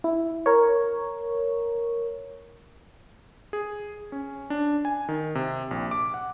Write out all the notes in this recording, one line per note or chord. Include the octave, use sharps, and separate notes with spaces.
E4
A#4 C#5
G#4
C#4
D4
G#5
D#3
C3
A#1
D6
F#5